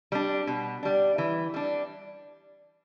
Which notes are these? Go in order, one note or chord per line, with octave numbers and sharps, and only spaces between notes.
G3 D4
B2
G3 D4
E3
G3 D4